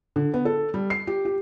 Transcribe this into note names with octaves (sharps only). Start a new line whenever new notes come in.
D3
B3
A4
G3
C7
G4
G4